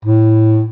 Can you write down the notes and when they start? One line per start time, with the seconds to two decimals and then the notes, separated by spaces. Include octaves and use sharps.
0.05 A2